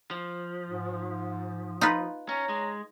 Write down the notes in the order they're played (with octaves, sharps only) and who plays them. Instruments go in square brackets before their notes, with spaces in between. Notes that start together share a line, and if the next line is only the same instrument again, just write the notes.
[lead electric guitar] F3
[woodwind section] G#2
[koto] D#4 F4 B4
[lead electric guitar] C#4 [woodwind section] C#5 A#5
[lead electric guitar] G#3